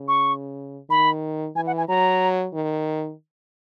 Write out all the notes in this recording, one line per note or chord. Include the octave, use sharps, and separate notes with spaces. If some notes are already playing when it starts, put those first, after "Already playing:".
Already playing: C#3
C#6
D#3 B5
E3 G#5
F#5
G#5
F#3 A#5
D#3